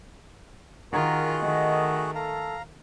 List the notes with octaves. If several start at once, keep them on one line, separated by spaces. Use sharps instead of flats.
D#3 F4 F#4 G#4 A#4 F#5
D#3 A3 D#5
A4 F5 A#5